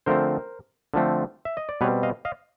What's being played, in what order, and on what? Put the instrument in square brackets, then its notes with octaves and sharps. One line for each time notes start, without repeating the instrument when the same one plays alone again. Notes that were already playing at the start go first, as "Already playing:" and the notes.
[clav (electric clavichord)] D3 F3 A3 C4 A#4 C5
D3 F3 A3 C4
E5
D#5
D5
B2 G3 C4 B4 C#5
D#5 F5
D#5 F5